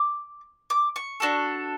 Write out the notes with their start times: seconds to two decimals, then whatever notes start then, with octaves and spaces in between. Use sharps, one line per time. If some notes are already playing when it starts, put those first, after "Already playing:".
Already playing: D6
0.70 D6
0.96 C#6
1.20 D4 F#4 A4